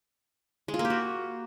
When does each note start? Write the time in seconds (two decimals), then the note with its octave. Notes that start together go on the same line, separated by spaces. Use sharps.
0.68 G#3
0.74 F4
0.79 A#3
0.85 G4
0.90 F#4